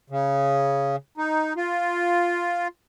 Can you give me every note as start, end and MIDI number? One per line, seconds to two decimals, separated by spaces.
0.10 0.96 49
1.18 1.53 63
1.57 2.68 65